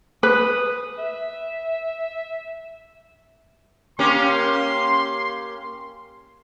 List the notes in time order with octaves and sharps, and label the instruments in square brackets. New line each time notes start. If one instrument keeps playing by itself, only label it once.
[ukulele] B4 [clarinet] D#6
[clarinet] E5
[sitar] A#3 C#4 G4 [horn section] C6